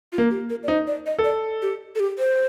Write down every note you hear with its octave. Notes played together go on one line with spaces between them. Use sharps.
F4
A#3
G4
A#4
D5
D#4 C5
D5
D#5
A4
D5
G4
A4
G4
C5